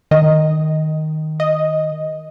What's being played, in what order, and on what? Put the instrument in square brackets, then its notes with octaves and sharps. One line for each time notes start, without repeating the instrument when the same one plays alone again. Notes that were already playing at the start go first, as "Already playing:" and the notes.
[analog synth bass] D#3 [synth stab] D#5
[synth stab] D#5